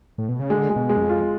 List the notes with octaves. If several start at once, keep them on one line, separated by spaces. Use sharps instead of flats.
A2
B2
C#3
D3 G#3
G#3
B2
G#3
F#2
F2
F4